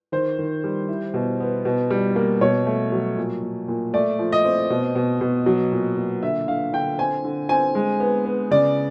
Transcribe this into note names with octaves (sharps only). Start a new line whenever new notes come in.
D#3 C5
D#3
G3
E4
B2
B3
B2
G3
A#3
B2 C#5
A3
F#3
A#2
A#2
A#2
A3 D5
F3
D#5
C4
B2
B2
B2
F#3
A#2
A#2
D3 E5
D3 F5
D3 G5
C4 G#5
D3
C4 G#5
G#3
B3
B3
C#3 D5